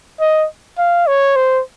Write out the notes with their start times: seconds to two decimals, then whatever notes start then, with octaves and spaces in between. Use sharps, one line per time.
0.20 D#5
0.78 F5
1.07 C#5
1.36 C5